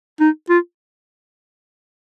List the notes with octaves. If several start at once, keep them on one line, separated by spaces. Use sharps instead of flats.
D#4
F4